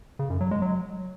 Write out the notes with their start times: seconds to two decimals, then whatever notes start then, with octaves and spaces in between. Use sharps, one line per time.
0.19 C#3
0.30 F#2
0.41 F#3
0.51 G#3
0.62 F#3